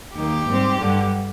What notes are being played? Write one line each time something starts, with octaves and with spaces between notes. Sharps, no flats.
D#2 D#3 A#3 G4
G#2 G3 C4
G2 D3 G3